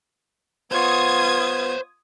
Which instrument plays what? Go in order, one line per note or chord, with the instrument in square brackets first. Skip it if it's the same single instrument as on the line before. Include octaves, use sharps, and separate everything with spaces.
[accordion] B3 [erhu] F4 [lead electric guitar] C5 C#5 [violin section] D#6 G#6